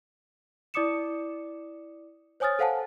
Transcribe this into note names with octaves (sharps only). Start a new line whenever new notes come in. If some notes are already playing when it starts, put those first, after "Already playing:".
E4 D5 D6 D#6 C#7 E7
C5 C#5 G#5 D#6 F6 A6
A4 C5 F5 F#5 G#5 A5